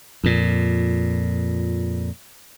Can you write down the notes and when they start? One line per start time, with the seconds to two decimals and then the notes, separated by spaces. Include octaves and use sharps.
0.24 F2 A#2